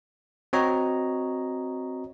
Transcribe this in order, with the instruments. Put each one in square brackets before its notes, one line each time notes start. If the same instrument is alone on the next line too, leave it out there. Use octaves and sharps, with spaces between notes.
[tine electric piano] C4 F#4 C#5 D#5 A#5